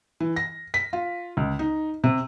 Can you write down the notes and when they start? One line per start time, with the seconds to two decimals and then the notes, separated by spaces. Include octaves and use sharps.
0.20 E3
0.36 A#6
0.74 B6
0.93 F4
1.37 C#2
1.59 D#4
2.04 C3